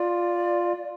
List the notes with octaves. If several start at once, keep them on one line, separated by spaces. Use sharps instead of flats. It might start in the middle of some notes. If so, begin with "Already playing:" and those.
Already playing: F4 D5